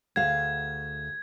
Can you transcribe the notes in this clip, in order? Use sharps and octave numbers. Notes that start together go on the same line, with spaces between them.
D2 G#4 F5 G#6